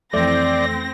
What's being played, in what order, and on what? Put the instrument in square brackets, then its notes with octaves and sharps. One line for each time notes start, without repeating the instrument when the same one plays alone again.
[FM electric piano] F2 E3 A3 [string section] C4 A#6 [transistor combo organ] D5